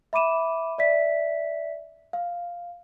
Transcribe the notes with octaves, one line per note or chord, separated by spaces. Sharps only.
E5 B5 D6 D#7 E7
D5 E5 B6
F5